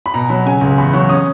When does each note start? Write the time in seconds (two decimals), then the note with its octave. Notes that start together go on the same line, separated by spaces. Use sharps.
0.06 B5
0.14 B2 A#5
0.29 F#3 B5
0.45 C#3 G#5
0.61 C#2
0.78 E2 B5
0.93 F#3 C#6
1.09 C#4 D#6